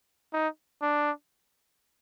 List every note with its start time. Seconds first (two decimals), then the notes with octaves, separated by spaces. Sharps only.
0.33 D#4
0.82 D4